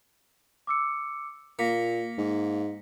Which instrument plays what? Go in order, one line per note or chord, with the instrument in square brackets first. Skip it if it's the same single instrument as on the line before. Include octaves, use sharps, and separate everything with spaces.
[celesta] D6 E6 C#7
[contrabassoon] A#2 [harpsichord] A#3 [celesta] A#6 B6 C#7
[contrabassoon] G#2